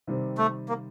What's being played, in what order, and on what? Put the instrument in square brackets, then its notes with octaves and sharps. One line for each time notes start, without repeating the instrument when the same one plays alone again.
[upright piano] C3 D#3 G3 C4
[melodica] A3
A#3